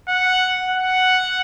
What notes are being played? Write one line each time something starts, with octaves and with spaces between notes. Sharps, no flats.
F#5
F#5